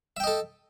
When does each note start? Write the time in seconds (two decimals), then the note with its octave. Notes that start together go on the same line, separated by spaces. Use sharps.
0.17 E5
0.20 G5
0.24 D#5
0.27 A4